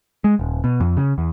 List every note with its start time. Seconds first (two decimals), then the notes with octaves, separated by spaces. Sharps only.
0.24 G#3
0.39 D#1
0.64 B2
0.80 F2
0.97 C#3
1.18 E2